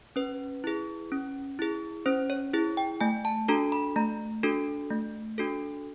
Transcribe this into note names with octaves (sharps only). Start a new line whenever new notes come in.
C#4 B4
E4 G#4
C#4
E4 G#4
C#4 C5
C#5
E4 G#4
G5
A3 G#5
A5
D4 F#4 A4 A#5
B5
A3 A#5
D4 F#4 A4
A3
D4 F#4 A4